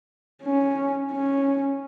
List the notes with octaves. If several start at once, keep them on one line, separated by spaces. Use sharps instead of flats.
C#4
C#4